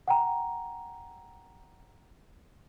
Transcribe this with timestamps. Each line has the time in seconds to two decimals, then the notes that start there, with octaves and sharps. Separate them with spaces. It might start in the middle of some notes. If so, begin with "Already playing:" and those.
0.08 F#5 G5 A#5